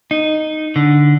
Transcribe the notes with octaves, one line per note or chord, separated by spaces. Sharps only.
D#4
D3